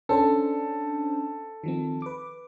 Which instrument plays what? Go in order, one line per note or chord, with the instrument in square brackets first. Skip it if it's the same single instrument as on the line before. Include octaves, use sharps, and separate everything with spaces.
[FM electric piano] C#4 D4 C5 [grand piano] A4
[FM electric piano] D#3 F3 C4
B4 D6